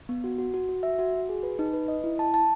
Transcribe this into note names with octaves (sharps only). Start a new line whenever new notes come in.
B3
F#4
F#4
F#4
F#4
E5
F#4
F#4
G#4
B4
D#4
B4
D#5
E4
A5
A5